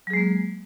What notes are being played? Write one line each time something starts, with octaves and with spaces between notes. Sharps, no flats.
F#3 G#3 A#3 G#4